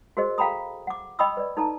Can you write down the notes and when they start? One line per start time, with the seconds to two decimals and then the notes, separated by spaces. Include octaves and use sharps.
0.17 F#4 G#4 A#4 C5 D#5
0.38 A4 F5 G5 A#5 B5 D#6
0.87 F#5 D6
1.19 D#5 G5 B5 C#6 D#6 E6
1.37 B4 D5
1.57 D#4 A4 A5 A#5